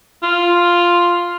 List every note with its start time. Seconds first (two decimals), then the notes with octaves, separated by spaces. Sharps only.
0.23 F4